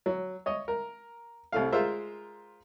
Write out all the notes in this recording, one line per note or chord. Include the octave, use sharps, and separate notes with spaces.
F#3
C#5 D#5
A#4
C2 A3 F5
G#3 F4 A#4 C5 E5